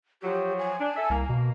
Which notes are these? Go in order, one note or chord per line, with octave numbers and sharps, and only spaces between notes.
F3 F#3 G4
G#5
D4
A4 E5
C2 A#3
B2